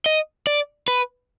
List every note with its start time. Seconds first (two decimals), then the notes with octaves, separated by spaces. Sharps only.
0.06 D#5
0.47 D5
0.88 B4